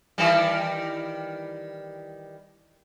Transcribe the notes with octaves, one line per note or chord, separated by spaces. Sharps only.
D#3 E3 G3